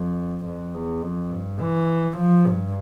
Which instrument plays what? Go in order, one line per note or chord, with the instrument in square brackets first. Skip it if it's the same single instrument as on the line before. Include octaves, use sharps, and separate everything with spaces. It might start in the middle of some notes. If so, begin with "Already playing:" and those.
Already playing: [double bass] F2
F2
E2
F2
G2
E3
F3
G2